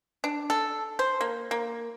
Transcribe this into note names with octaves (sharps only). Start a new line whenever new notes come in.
D4
A4
C5
A#3
A#3